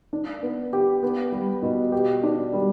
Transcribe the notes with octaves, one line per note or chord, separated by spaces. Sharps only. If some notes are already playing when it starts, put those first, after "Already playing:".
D4
B3
G4
B3
G3
B2
G4
D4
G3